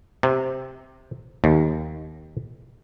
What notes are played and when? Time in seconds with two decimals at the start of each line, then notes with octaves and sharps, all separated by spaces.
0.23 C3
1.44 D#2